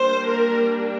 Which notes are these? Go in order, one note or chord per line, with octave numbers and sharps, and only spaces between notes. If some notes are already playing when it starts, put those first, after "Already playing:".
Already playing: G3 A#3 D4 C5
A#4